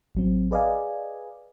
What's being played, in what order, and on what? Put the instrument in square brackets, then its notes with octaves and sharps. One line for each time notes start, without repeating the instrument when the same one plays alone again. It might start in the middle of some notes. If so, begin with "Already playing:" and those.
[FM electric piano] A1 F#3 C4
G#4 B4 D5 D#5 F5 G#5